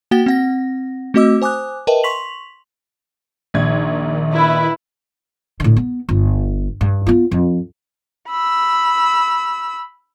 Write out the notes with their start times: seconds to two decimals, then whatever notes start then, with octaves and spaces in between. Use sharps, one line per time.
0.11 A#3 F#4 F#5 G5 A6 G7
0.26 C4 F#5 A#6
1.14 A3 C4 F#4 D#5 D6 E6
1.42 C5 G#5 D6 D#6 F#6
1.87 A#4 B4 D#5 E5 G5 A5
2.03 C6 C#6 B6 F7 F#7
3.54 A#1 D#3 G#6
4.32 E4 B4
5.60 A2 D3
5.76 B3
6.09 G1
6.81 G2
7.06 B3 F4
7.31 F2
8.29 B5 E6